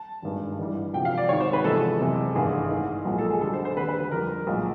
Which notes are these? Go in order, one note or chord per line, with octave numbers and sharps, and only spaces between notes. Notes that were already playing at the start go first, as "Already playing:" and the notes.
Already playing: A5
G#1 G2 D#3 G#3
A1 G2 E3 G3
E1 D2 C3 F3 G5
F5
D5
G#1 G#2 D#3 C#5
C5
B4
E2 C3 F3 G#3 A4
F#1 E2 C3 E3 G#3
A1 G2 D#3 G#4
A1 G#2 E3
B1 A#2 F3 G#3
A4
G#4
D2 D3 G3 A4
C5
C5
E1 D#2 D3 B4
B4
B4
F2 D3 G3 A#4
B1 A#2 F3 G#3